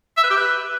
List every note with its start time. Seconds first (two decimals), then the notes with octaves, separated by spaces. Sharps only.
0.17 E5
0.24 B4
0.30 G4
0.37 B4